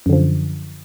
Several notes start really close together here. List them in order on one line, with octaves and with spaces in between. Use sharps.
F#2 D3 F3